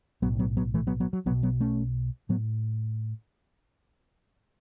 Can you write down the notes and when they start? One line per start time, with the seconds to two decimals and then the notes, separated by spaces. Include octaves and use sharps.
0.22 B1 F#3 B3
0.26 A2
0.39 F#3 B3
0.57 F#3 B3
0.74 E3 A3
0.87 F#3 B3
1.00 F#3 B3
1.13 F#3
1.26 B1 F#3 B3
1.30 B2
1.43 F#3 B3
1.60 A3 C#4
2.29 A2 F#3 B3